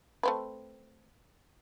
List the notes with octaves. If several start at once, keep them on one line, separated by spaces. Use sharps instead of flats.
A3 C4 B4